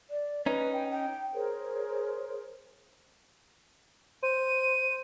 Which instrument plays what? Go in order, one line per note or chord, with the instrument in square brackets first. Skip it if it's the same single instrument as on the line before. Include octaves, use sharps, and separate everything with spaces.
[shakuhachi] D5
[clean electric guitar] C#4 D#4 [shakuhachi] B4
[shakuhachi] G5
G5
[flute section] G#4 A#4 C5 C#5
[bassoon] C5 [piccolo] D#7